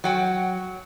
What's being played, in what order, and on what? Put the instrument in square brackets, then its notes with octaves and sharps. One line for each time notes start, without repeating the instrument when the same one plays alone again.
[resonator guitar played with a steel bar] F#3 F#5 G5